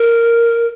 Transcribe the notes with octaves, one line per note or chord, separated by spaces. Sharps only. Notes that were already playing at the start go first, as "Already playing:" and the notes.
Already playing: A#4